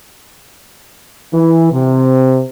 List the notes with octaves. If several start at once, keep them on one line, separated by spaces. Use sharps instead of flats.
E3
C3